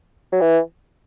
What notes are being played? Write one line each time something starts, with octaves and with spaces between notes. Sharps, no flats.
F#3
E3